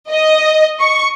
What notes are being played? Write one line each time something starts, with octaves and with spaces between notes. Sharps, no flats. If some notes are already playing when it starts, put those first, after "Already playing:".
D#5
C#6